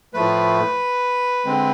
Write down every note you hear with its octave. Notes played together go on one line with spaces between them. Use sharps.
A2 F3 A3 B4
D3 G#3 C4